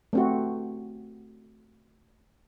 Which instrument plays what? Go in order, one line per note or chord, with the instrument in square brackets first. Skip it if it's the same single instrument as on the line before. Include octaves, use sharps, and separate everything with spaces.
[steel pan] A3 C4 F#4